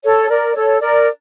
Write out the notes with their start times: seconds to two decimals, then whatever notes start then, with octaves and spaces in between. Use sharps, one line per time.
0.03 A4 C#5
0.29 A#4 D5
0.55 A4 C#5
0.80 A#4 D5